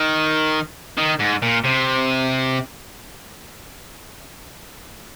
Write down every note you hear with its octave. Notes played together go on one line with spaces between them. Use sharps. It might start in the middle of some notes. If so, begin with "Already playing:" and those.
Already playing: D#3
D#3
G#2
A#2
C3